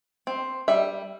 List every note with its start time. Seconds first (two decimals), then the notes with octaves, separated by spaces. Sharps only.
0.27 C4
0.68 G3 E5